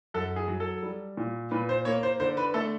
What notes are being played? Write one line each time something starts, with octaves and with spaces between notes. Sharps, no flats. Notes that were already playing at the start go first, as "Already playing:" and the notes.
F#2 A4
G#4
F#3
A4
G3
A#2
A#2 B4
C5
A#3 C#5
C5
D3 C5
B4
A3 A4